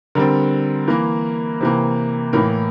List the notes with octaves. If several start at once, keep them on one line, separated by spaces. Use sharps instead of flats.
D3 G3 C4 A#4
E3 A#3 A#4
C3 E3 A#3
A2 E3 A#3 A#4